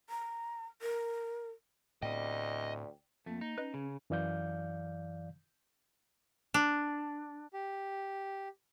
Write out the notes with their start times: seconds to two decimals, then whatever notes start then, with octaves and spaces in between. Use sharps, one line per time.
0.10 A#5
0.82 A#4
2.02 D2 A2 B3 C4 D5 D#5 G5
3.26 F2 A3 A#3
3.41 D#4
3.58 C#4 B4 D#5
3.74 C#3
4.10 F#2 E3 D5 F5 G6
6.54 D4
7.54 G4